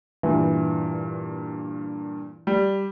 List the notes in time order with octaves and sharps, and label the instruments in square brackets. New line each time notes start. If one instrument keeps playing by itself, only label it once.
[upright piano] G2 A#2 [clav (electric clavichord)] E3
[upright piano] G3